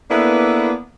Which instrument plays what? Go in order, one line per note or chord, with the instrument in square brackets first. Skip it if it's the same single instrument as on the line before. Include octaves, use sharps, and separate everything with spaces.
[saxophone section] A#3 B3 D4 E4 A4 B4